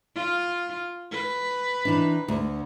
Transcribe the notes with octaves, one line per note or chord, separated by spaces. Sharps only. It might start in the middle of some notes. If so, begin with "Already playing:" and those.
F4
B4
D#3 E3 D4
D2